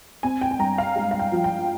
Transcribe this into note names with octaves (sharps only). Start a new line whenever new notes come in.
C4 G#5
G5
G#5
G2 A#5
F5
G#3
F5
G5
F3
G5